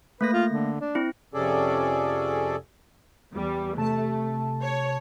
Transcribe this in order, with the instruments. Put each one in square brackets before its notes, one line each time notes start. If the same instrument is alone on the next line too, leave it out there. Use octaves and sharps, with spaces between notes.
[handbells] A3 A#3 A#6 [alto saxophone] B4
[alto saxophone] F4
D3
D4
[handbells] C4 E4
[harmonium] F2 C3 C#4 G#4 A4 D5
[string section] E2 G3
[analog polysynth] C3 A5 [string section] A3
[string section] C#5